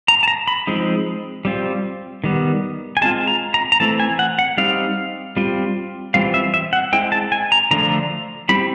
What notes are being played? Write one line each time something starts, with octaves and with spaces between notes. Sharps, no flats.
A#5
A5
A#5
B5
F3 G#3 C4 D#4
G3 C4 F4
D#3 G3 B3
G#5
G#3 C4 F4 A5
A#5
A#5
A#5
E3 A3 C4 E4 A5
G#5
F#5
F#5
G3 C4 D#4 F5
G3 C4 F4
E3 G3 C4 F4 F5
E5
E5
F#5
G#3 C4 E4 G5
A5
G#5
A#5
D3 F3 A3 D4 F4 A#5
G3 C4 E4 B5